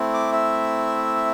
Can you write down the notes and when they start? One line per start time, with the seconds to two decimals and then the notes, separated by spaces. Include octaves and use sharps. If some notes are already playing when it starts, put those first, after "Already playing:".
Already playing: A3 C4 E4
0.14 D6
0.33 E5